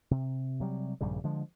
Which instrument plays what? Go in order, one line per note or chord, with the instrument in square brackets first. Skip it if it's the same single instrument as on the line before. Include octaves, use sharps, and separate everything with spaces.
[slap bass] C3
C3 F#3 G3
A#1 G2 C#3 G3
D3 F3 G#3